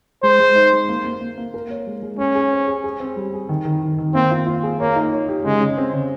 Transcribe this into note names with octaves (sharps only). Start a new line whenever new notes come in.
G#3 C5
G#3
D#4
G#3
A#3
A#3
A#3
A#3
A#4
C#5
G#3
G#3
C#4 G#4
G#4
C5
G#4
G#4
C4
G3
G#4
D#3
D#3
D#3
D#3
A#3 C4
F4
F4
G#4
A#3 C#5
D#4
C#5
G4
C#3 G#3
C#3
C4
C#3